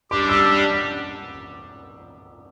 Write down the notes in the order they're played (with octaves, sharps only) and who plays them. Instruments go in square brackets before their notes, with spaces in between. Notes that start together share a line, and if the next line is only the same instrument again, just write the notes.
[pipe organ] G3 D4 G4 [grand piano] D6
[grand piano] E6